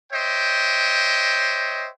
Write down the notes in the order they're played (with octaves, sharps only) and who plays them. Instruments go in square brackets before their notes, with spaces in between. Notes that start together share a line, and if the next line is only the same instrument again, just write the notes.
[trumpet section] C5 C#5 D#5 E5 G5